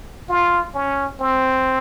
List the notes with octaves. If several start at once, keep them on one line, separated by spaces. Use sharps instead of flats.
F4
C#4
C4